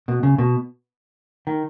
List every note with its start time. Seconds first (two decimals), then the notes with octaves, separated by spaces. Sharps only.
0.08 B2
0.23 C#3
0.38 B2
1.47 D#3